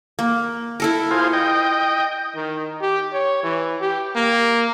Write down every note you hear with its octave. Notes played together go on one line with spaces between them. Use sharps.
A#3
E4 A4 A#4
F4 G#4 C5
D#5 G5
D#3
G4
C#5
E3
G4
A#3